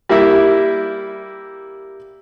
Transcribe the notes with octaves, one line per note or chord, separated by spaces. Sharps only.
G3 A#3 E4 E5